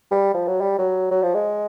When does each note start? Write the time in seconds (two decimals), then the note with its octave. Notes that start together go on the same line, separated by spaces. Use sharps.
0.11 G3
0.34 F3
0.48 F#3
0.61 G3
0.79 F#3
1.11 F#3
1.23 F3
1.34 G#3